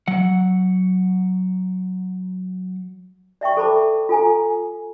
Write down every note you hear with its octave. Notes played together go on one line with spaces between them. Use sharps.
F#3 F#5
D5 E5 G5 C#6
A4 C5 A5 B5 D6
F4 A4 G#5 A#5